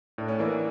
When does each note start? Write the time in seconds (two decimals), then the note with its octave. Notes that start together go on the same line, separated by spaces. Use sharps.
0.18 A2 D4
0.28 C#4
0.39 E3 A#3 D4